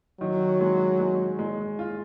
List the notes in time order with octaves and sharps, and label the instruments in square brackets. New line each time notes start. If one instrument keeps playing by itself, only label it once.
[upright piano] D#3 [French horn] F#3
[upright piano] G#3
G#3
G#3
F4